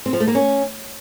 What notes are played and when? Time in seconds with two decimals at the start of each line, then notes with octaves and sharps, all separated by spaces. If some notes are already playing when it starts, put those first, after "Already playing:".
0.06 C4
0.13 F3
0.20 A3
0.28 A#3
0.35 C#4